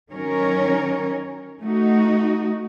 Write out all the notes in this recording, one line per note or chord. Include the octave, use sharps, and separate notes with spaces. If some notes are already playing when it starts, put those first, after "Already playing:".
D#3 F#3 C#4 A#4 C#5
A3 D#4 F#4